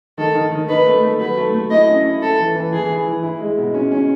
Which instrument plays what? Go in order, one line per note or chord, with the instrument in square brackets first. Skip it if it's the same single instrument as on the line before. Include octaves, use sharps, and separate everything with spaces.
[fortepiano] D#3 [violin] A4
[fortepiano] D#3
D#3
[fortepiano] D#4 [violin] B4
[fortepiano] A3
A3
[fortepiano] F#3 [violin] B4
[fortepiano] A3
A3
[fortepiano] E4 [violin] D#5
[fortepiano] C#4
E4
[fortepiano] E4 [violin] A4
[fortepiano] E3
E3
[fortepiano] E3 [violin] G#4
[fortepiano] E4
E3
E4
G#3
B2
C#4
C#4